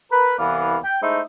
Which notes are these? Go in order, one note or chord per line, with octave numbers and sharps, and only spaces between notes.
A#4 B4
C2 E3 B3 D5 F5
G5
G#3 A3 D#4 E4 C5 E5